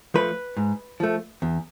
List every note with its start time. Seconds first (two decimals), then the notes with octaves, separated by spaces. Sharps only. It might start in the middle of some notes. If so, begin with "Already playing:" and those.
0.14 F3 A3 B4
0.57 G#2
1.00 F3 A3
1.42 E2